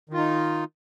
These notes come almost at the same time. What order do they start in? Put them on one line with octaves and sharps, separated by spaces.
D#3 F4 D#4